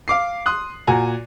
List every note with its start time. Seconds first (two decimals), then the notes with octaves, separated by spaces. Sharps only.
0.08 F5 D6 C7
0.46 C6 D#6 F#6
0.87 A#2 F#4 G#5 A#5